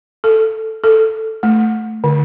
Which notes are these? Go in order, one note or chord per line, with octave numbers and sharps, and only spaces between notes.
A4
A4
A3
D3